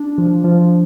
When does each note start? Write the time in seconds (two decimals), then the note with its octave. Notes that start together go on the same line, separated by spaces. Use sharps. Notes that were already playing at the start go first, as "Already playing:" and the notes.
Already playing: D4
0.18 F3
0.44 F3